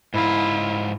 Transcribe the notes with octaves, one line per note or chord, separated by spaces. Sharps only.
G#2 E4 F4